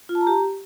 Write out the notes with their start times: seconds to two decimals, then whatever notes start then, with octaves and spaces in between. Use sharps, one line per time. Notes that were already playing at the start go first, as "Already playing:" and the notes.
0.09 F4
0.15 A5
0.21 A#5
0.27 G4